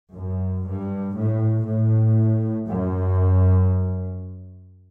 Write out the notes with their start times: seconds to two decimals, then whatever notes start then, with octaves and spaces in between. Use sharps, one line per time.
0.13 F#2
0.64 G2
1.15 A2
1.65 A2
2.68 F#2